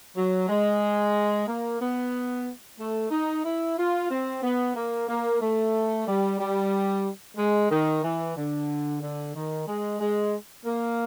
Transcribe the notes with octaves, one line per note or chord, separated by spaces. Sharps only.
F#3
G#3
A#3
B3
A3
D#4
E4
F4
C4
B3
A#3
A#3
A3
G3
G3
G#3
D#3
E3
D3
D3
D#3
G#3
G#3
A#3